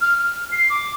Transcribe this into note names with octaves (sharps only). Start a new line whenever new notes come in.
F6
F6
C7
D6